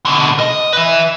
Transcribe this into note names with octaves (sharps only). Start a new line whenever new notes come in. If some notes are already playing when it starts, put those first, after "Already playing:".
B2 D3
D#5
B4 E5